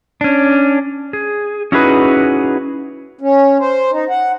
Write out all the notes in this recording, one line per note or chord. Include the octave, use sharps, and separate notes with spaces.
C#4 D4
G#4
C#4 D#4 E4 F#4 G#4 B4
C#4
C5
D#4
F#5